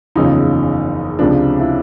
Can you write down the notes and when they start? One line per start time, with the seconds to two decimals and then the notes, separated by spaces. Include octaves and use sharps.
0.16 F#1 E2 C#3 F3 D#4
1.19 C#2 C3 F3 D4
1.60 E4